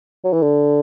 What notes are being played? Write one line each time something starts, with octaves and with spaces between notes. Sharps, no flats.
F#3
E3
D3